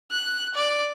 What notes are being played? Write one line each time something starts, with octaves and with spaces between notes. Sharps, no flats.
F#6
D5